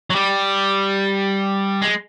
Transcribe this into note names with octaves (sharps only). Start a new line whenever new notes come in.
F#3
G3
G#3